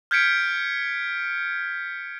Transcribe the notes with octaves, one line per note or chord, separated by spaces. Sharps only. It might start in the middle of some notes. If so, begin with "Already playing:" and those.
F6 G6 G#6 B6 C#7 D7